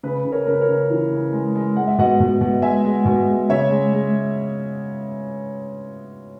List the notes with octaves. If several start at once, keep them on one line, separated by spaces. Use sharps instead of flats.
C#3 B4
C#3
A#4 C#5
C#3 A#4
B4
A#4 C#5
C#3
E3
C#3
G#3
G#3
G#3 F#5
E5
B2 D#5 F#5
B2
B2
G#3 E5 G#5
G#3
B2
G#3
C#3 C#5 E5
G#3
G#3